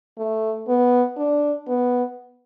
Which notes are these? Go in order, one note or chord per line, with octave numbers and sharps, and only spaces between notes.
A3
B3
D4
B3